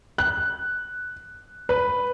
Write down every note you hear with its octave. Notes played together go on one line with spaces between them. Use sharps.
F#6
B4